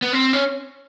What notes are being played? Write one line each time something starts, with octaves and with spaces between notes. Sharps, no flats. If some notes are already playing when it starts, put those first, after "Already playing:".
B3
C4
C#4